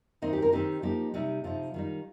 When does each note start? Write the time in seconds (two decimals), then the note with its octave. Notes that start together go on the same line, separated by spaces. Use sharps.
0.22 D#3 C4 D#4 D#5
0.33 G4
0.42 A#4
0.52 D#3 C4 D#4 G4
0.82 F3 A#3 D#4 G4
1.14 C3 G3 D#4
1.44 C3 F3 D#4 F4
1.74 D#3 G3 D#4